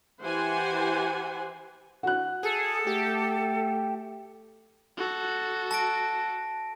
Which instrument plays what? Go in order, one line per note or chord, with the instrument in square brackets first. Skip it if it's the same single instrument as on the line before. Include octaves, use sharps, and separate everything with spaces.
[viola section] E3 G4 C5 F#5 G#5
[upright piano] F#4 F#6
[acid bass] G#4 [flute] A4
[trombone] A3 [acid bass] G4
[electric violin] F#4 A4
[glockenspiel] A5 A#6 D7